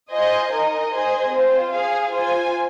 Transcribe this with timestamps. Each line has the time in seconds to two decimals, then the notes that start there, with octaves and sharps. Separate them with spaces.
0.12 F4 C5 D#5 G#5
0.51 D#4 A#4 D#5
0.92 G#4 C5 D#5 G#5
1.32 C4 F4 C5
1.73 G#4 F5 G#5
2.12 F4 C5 G#5